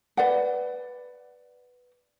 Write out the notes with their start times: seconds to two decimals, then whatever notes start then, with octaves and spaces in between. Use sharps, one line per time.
0.17 B4 D5 F#5